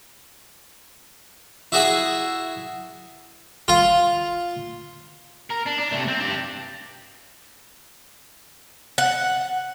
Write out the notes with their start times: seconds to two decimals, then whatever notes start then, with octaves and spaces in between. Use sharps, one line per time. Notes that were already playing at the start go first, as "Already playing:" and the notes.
1.72 E4 F#4 G#4 E5
3.68 F4
5.51 A#4
5.67 D4
5.80 D4
5.93 C3 A3
6.08 C4
6.21 D4 G4
8.98 F#5